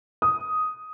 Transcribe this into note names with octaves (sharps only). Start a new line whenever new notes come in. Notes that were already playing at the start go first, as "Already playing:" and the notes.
D#6